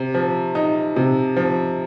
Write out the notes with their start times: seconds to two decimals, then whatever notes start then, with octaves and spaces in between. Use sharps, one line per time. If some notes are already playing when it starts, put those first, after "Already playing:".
Already playing: C3
0.14 F3
0.55 D#4
0.96 C3
1.37 F3